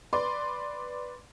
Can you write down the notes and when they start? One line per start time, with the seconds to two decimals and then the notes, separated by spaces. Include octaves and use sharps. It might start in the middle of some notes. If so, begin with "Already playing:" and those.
0.13 B4 D5 C6